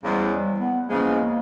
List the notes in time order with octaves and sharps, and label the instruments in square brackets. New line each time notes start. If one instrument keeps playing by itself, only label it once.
[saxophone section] E2 C#3 F3 G#3 [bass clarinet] G3
[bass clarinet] G3
B3
[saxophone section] E2 C#3 F3 G#3 [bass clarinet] A#3